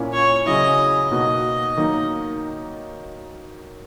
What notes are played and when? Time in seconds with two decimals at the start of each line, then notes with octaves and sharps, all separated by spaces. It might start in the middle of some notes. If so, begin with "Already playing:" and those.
Already playing: A#2 A#3 C#4 E4
0.13 C#5
0.46 C#3 F#3 C#4 E4 D#5
1.11 B2 A#3 D#4 F#4 D#5
1.77 D#3 F#3 A#3 D#4